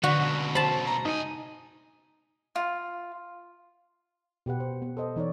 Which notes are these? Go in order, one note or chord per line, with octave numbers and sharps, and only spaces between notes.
D3 B3 D#4 F#4
C#2 B2
C5 A5 B5
A#5
G2 D#4 G#5
F4
B2 G4 B4 F#5
C5
B3
A4 C5 D#5
E3 D#4 C#5 D5